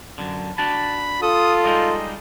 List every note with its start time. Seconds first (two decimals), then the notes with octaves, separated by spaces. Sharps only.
0.18 F#2 D3
0.58 D4 F#4 A5 B5
1.23 F4 A4 D#6
1.65 G3 G#3 D#4 D#5